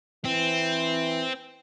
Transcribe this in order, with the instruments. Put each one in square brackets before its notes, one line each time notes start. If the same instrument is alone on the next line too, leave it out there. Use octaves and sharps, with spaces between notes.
[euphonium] E3 [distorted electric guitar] C4